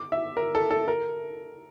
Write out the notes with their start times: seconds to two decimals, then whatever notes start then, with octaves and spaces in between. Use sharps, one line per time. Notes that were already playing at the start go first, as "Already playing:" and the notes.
Already playing: D6
0.12 E5
0.37 A#4
0.55 A4
0.71 A4
0.88 A#4